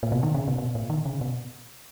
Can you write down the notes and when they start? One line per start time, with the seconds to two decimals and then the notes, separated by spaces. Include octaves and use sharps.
0.03 A#2
0.12 B2
0.23 D#3
0.35 C#3
0.48 B2
0.58 B2
0.75 A#2
0.90 D#3
1.05 C#3
1.21 B2